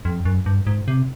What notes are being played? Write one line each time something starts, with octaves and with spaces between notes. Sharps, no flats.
F2
F#2
G2
G#2
C3